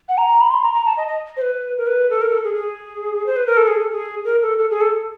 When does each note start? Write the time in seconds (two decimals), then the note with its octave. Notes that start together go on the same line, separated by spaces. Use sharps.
0.09 F#5
0.18 A#5
0.41 B5
0.51 C6
0.63 A#5
0.74 A#5
0.86 A5
0.97 D#5
1.08 D#5
1.37 C5
1.41 B4
1.78 A#4
1.87 B4
2.10 A4
2.21 A#4
2.32 A4
2.44 G#4
2.54 G#4
3.26 C5
3.36 B4
3.46 A#4
3.57 A4
3.68 G#4
3.79 A4
3.91 G#4
4.25 A#4
4.42 A4
4.58 A4
4.70 G#4
4.81 A4